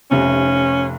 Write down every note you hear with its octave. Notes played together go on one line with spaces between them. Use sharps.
F1 C3 C#4